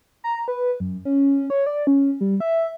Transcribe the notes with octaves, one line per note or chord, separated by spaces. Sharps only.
A#5
B4
F#2
C#4
C#5
D5
C#4
G3
E5